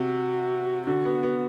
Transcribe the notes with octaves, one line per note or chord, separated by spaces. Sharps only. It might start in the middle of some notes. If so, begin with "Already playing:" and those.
Already playing: C3 F#4
D3 F#4
B3
B3